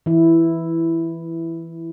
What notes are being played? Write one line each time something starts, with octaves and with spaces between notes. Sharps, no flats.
E3 E4